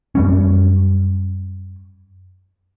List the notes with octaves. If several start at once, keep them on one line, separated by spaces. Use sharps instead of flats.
F#2 G3 C#4